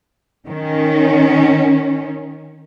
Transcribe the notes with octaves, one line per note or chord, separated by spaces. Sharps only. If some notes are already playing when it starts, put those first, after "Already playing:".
D#3 C#4